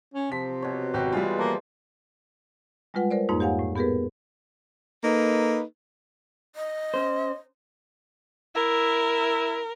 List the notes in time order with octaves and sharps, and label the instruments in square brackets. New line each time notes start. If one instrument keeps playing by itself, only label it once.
[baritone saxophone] C#4
[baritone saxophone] C3 [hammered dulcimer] F3 [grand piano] B6
[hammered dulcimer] B2 C#5
[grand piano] G#1 G4 [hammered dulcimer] F#4
[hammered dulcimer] E3 G#3 E4 [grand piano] G3 F4
[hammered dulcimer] F3 [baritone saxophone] A#3
[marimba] G3 G#3 F4 B4 F#5
A#4 C5 D5
F2 G#2 A#3 D#4
G4 C#5 F5 F#5 G#5
A2
B3 G4 G#4 A#4 B4
[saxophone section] A#3 D#4 A4 B4
[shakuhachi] D#5
[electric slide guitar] C#4 C5
[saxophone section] E4 [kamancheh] A#4